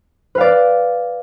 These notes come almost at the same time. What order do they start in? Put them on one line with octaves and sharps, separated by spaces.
B4 F5 D5